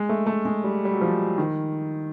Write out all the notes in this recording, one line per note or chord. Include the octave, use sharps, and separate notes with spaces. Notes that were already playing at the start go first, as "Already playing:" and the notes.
Already playing: G#3
A3
A3
G#3
G3
G3
F#3
F3
D#3